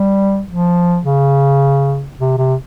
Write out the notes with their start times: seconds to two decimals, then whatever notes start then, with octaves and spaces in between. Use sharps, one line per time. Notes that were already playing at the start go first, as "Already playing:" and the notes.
Already playing: G3
0.48 F3
1.05 C#3
2.19 C3
2.38 C3